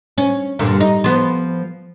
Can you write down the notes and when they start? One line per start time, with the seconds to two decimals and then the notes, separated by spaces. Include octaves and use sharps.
0.18 C#4
0.59 G2 A#2 D3
0.80 D#4
1.04 F3 B3